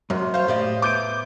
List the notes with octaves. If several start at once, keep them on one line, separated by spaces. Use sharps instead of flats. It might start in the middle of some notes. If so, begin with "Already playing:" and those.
F#2 C3 D#3
C5 C#5 F5
A2 G4 D5 D#5
B3 E4 D6 G6 D7